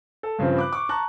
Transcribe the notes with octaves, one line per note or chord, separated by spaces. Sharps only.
A4
G2 C#3 F3 C4 C5
B5 D6 F#6
C#6 D6
A5 A#5 C#6 F#6